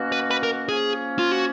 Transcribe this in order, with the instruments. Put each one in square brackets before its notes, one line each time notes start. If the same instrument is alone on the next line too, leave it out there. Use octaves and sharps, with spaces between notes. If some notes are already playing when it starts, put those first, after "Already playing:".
Already playing: [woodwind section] B2 A#3 C#4 F#4
[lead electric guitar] B4
B4
A#4
[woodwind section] F3 A#3 C#4 [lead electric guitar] G#4
[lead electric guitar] F4
F#4